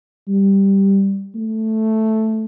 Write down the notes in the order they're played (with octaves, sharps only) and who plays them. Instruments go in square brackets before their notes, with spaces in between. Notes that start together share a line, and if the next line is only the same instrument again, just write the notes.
[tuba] G3
A3